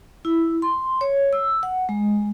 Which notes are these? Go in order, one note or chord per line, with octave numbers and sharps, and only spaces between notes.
E4
C6
C#5
E6
F#5
G#3